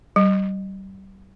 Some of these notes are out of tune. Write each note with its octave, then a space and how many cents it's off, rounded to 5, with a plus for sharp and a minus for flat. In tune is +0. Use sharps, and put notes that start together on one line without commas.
G3 -30